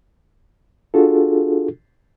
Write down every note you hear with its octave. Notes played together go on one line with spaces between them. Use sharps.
D4 F4 F#4 G#4 A4